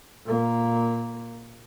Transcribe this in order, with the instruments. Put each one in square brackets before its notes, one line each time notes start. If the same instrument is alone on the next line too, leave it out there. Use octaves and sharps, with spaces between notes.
[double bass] A#2 A#3